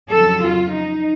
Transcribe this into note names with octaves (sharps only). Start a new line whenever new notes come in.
F2 C#3 F#3 A4
F4
D#4